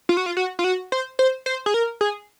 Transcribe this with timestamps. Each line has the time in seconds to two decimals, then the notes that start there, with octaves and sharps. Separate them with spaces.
0.09 F4
0.17 F#4
0.26 F4
0.37 F#4
0.59 F4
0.64 F#4
0.92 C5
1.19 C5
1.46 C5
1.66 G#4
1.74 A#4
2.01 G#4